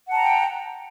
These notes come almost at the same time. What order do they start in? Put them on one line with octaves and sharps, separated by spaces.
F#5 A5 A#5 G5